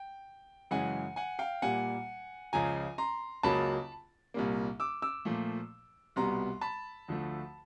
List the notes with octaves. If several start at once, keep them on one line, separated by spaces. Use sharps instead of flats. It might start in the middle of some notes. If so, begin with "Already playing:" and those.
Already playing: G5
F#2 C#3 E3 G#3 F#5 G#5
F#5 G#5
F5 G5
A#2 G3 A#3 F#5 G#5
C#2 C#3 F3 G#5 A#5
A#5 C6
C#2 C#3 F#3 A#3 A5 B5
C2 A#2 G3 A#3
D6 E6
D6 E6
A#2 F3 A3
C2 B2 G3 B3 A#5 C6
A5 B5
D2 D3 F3 A3